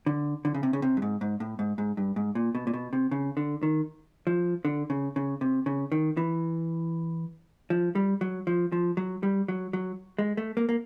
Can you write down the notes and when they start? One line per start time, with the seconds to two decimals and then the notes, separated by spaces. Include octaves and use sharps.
0.06 D3
0.45 D3
0.55 C#3
0.63 C3
0.73 C#3
0.82 C3
0.97 G2
1.02 G#2
1.21 G#2
1.40 A2
1.59 G#2
1.78 G#2
1.97 G2
2.16 G#2
2.35 A#2
2.55 B2
2.67 A#2
2.74 B2
2.93 C3
3.11 C#3
3.37 D3
3.63 D#3
4.27 F3
4.65 D3
4.90 C#3
5.16 C#3
5.41 C3
5.66 C#3
5.92 D#3
6.17 E3
7.70 F3
7.95 G3
8.21 F#3
8.47 F3
8.72 F3
8.97 F#3
9.23 G3
9.48 F#3
9.73 F#3
10.19 G#3
10.37 A3
10.57 A#3
10.69 A#3